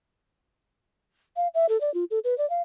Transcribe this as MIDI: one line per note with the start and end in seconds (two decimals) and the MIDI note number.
1.36 1.48 77
1.54 1.66 76
1.69 1.80 69
1.81 1.92 74
1.94 2.04 65
2.11 2.19 69
2.24 2.36 71
2.38 2.48 74
2.50 2.62 77